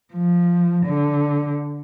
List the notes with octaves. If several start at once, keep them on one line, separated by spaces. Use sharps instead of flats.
F3
D3